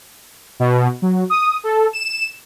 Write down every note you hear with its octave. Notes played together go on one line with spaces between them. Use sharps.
B2
F#3
D#6
A4
E7